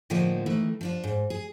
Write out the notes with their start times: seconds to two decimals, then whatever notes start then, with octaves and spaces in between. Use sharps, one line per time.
0.10 A2 D3 F3 G#3 A#3 D#4
0.46 D#3 E3 A3
0.81 F3 D4 F4
1.04 G#2
1.30 G#4